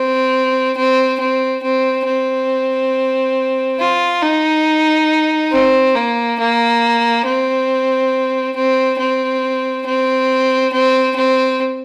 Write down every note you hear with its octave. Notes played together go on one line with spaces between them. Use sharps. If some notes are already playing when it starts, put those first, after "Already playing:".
Already playing: C4
C4
C4
C4
C4
F4
D#4
C4
A#3
A#3
C4
C4
C4
C4
C4
C4